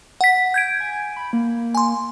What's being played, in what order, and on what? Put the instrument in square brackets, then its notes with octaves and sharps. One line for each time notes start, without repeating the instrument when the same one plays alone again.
[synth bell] F#5 B6
G6 G#6 D7
[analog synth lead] G#5
B5
A#3
[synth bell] G#5 C6